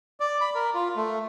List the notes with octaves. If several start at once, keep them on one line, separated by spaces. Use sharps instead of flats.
D5
B5
A#4
F4
A3